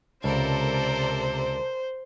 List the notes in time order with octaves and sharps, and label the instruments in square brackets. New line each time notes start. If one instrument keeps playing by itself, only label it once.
[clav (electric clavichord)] C#2 [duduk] C3 [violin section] A4 A#4 D5 [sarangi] C5